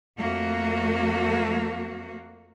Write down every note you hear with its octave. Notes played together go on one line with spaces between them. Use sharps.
F2 A3 A#3 F#4